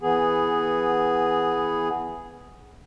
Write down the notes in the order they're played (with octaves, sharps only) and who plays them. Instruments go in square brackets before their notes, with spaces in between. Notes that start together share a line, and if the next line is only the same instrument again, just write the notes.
[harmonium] E3 B3 G#4